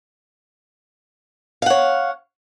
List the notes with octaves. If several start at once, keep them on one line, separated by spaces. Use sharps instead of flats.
C#5 F5 F#5